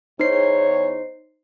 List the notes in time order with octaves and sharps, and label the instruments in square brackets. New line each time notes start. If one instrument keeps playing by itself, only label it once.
[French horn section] E2 C#5 [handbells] D#4 C5 C7